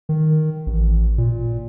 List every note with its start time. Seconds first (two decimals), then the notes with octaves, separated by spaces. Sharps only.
0.09 D#3
0.66 A1
1.18 A#2